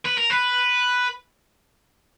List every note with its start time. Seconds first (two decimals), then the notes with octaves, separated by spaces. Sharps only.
0.05 B4
0.17 A#4
0.30 B4